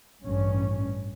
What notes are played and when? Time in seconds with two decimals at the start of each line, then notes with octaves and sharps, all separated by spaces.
0.24 A1 G2 C#4